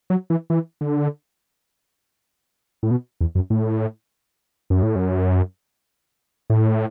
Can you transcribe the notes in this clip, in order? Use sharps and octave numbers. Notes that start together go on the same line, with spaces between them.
F#3
E3
E3
D3
A2
B2
E2
F#2
A2
F#2
A2
F#2
A2